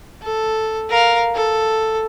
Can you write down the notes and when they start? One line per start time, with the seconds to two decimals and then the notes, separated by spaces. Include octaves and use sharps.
0.23 A4
0.90 A#4 F5
1.35 A4